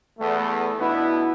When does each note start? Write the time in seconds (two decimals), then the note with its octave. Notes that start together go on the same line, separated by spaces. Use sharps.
0.19 E2 A3
0.80 B2 B3 D4 E4 F#4